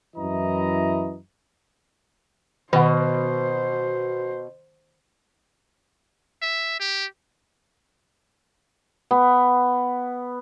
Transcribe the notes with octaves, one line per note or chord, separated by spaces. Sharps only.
F#2 E3 E4 D#5 A#5
B2 D#3 C5 F#5
E5
G4
B3